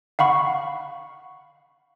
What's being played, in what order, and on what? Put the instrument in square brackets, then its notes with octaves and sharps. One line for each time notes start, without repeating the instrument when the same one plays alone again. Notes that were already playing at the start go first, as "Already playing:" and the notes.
[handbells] F5 F#5 B5 C#6